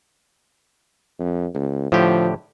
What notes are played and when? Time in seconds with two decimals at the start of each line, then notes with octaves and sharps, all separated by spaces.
1.20 F2
1.55 C#2
1.92 A2 D3 F3 G4